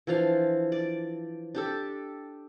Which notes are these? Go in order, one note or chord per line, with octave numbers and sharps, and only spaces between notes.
E3 F3 D4 F5
D5
D4 G4 A4